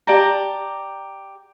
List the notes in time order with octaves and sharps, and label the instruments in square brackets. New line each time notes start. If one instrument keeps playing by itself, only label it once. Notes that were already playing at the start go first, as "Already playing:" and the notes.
[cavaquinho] G4 D5 A5 A#5